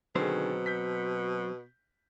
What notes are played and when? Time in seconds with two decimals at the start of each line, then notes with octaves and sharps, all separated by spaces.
0.15 B2 D3 D#3 F#3 C4 G#4 C5
0.66 G6 B6